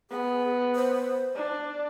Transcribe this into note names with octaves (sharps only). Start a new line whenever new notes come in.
B3 G#4
C5
D4